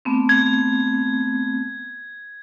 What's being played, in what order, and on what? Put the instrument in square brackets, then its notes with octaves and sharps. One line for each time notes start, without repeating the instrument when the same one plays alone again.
[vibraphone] A3 B3 C4
[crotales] G#6